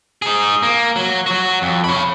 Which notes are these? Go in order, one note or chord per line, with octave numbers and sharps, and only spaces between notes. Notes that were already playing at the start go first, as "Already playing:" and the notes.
D#4 G#4
A#3
F#3
F#3 F#4
F2
C#5 B5